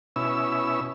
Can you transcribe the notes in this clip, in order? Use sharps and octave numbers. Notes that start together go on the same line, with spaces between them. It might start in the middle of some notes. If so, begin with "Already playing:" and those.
B2 C#4 E4 E6